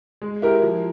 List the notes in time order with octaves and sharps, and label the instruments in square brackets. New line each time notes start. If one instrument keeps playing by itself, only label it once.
[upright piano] G#3
E4 G4 A#4
F3